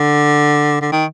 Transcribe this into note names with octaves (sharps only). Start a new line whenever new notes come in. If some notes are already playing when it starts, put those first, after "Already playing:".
Already playing: D3
D3
D#3